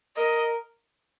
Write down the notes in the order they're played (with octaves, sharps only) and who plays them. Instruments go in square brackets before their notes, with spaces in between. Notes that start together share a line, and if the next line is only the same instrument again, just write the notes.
[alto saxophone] A#4 [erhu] D#5